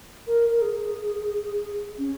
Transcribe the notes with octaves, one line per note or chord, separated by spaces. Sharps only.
A#4
A#4
G#4
C#4